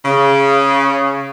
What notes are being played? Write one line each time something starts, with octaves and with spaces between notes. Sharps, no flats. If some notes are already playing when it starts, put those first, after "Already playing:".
C#3